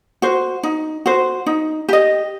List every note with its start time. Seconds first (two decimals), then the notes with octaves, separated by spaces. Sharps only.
0.22 F#4 C5
0.63 D#4
1.06 F#4 C5
1.46 D#4
1.89 G4 D#5